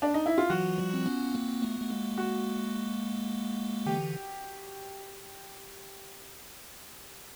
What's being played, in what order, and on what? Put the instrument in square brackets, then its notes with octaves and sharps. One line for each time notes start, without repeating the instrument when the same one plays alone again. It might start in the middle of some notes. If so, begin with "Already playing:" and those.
[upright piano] D4
D#4
E4
F4
[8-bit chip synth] E3 F#3 [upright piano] F#4
[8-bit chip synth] F3 G3
C4
B3 C#4
A#3 C4
A3 B3
A3
G#3 A#3
[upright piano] F#4
[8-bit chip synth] D3 E3 [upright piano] G4